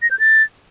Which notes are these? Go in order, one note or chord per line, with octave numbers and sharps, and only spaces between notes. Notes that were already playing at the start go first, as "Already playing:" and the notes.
A#6
G6
A6